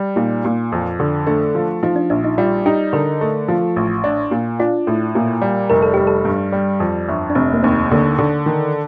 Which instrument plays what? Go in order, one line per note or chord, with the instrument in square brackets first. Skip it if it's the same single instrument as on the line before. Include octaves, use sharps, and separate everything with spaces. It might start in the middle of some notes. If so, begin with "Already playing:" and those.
Already playing: [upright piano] G3
[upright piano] A#2 [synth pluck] D#4
[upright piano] A#2
F2
D3
[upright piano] A3 [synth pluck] D4
[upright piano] F3
[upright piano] F3 [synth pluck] D#4
[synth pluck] D4
[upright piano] A#1 [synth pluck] D4
[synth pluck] D#4
[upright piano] G3 [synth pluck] F4
[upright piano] D#4 [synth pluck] G4
[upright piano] D3 [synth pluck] A#4
[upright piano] A3
F3
A1
D4
A#2
[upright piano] D4 [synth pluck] F4
[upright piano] A2
A#2
G3
[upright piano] F1 [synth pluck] A#4
[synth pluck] A4
[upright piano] G3 [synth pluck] G4
[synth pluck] A4
[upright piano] G2
G3
F2
G1
[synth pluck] D4
[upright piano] F1 [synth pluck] C4
[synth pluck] A#3
[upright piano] D#2 [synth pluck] C4
[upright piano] D3 [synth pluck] A#3
[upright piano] D3
D#3